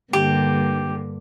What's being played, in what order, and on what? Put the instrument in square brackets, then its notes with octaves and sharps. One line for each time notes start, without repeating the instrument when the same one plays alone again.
[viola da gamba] G2 D3 A#3 [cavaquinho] G4